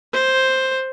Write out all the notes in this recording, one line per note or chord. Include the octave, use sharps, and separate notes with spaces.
C5